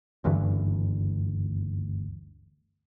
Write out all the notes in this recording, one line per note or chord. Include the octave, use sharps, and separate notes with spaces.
F#1 D2 G2 E3